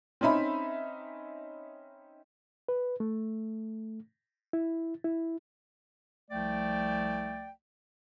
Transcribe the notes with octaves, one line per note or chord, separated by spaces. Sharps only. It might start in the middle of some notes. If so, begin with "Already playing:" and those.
C4 C#4 D#4 E5 B5
B4
A3
E4
E4
C2 F3 A3 D5 G5